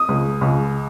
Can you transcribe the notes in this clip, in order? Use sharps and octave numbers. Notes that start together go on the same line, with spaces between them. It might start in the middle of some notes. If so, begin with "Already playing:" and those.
Already playing: D#6
C#2
C#2